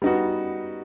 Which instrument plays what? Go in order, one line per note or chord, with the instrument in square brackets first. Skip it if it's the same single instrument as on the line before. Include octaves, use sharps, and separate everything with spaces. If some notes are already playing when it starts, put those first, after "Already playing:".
[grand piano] G3 B3 D#4 F#4